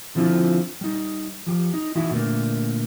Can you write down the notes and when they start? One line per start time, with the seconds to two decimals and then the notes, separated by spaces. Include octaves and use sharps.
0.15 D3 F3 C4 E4 F4
0.81 G3 D#4
1.47 F3 G4
1.73 D#4
1.95 E3 D#4 E4 F#4
2.11 A#2 D3 A3 A#3